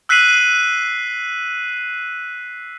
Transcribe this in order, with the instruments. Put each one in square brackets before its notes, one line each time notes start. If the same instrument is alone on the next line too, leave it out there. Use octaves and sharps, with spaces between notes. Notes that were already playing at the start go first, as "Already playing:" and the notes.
[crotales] E6 F#6 B6 C7 D#7 F#7